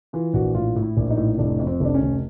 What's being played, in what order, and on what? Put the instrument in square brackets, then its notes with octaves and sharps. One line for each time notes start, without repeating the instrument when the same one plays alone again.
[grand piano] E3 F4
A#1 F#4
A2 F4
A2
E4
A#1
D#4
A2
F1 D4
F2
C4
F1 D4
C#4
F1